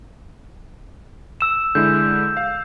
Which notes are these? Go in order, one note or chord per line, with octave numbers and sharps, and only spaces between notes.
E6 E7
D3 G#3 E4 G6
F5